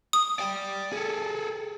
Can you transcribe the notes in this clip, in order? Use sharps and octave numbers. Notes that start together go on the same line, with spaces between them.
D#6
D5 G5
G#4 A4